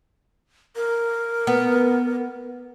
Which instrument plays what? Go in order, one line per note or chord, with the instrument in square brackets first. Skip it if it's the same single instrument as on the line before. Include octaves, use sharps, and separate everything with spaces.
[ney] A#4
[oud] B3